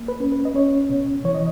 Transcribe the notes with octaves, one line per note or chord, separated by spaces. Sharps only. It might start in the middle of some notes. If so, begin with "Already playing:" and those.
Already playing: A#3
B4
C#4
B4
D#5
C#4 C#5
B2
E3 C#5
D#5